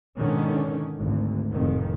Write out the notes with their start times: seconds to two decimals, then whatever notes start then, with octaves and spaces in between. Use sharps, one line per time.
0.16 G#2 B2 D3 D#3 C#4
0.96 G#1 D2
1.50 F1 F2 A2 D#3